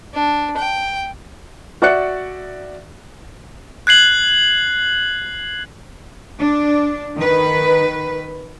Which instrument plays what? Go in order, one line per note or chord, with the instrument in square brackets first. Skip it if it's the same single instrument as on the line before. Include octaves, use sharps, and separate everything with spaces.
[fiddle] D4
G5
[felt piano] F#4 D5 E5 F#6 C#7
[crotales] F#6 G#6 C7 F#7
[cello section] D4
D#3 B4